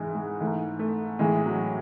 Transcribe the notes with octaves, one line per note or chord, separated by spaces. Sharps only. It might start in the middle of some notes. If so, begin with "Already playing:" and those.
Already playing: G#2 E3 G#3
G#3
G#2 E3 A3
A3
A2 E3 G#3
F#3